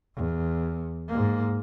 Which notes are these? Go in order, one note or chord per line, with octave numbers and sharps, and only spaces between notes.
E2
G#2 A#3